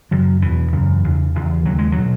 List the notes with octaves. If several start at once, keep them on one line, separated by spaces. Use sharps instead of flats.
F#2 C#3 F#3
E2 B2 E3
F#2 C#3
E2 C#3
E2 C#3
D#2 C#3 F#3
G#3
F#3
B2